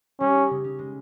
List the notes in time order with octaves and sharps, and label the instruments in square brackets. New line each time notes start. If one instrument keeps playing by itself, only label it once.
[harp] G3 [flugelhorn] C#4
[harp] D#4
C#3
C#4
G#3